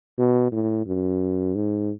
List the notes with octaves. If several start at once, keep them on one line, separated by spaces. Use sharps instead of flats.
B2
A2
F#2
G#2